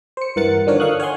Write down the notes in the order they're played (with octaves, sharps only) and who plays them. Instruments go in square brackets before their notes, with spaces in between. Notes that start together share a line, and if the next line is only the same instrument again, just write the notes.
[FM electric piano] C5 C#7
G2 E3 A#4 F#5 A6 C#7
D3 D#3 F3 D4 A#4 C#5
A4 F5 C#6 D#6 F#6
C#5 F#5 G#5 C6